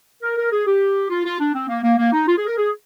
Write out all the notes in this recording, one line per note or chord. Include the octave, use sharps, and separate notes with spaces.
A#4
A#4
G#4
G4
F4
F4
D4
C4
A#3
A#3
A#3
D#4
F4
G#4
A#4
G#4